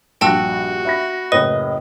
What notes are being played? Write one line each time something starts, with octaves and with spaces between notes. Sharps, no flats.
A#1 G2 F#4 G5 A5 E6
E5 B5 A#6
F#1 A2 B4 D#5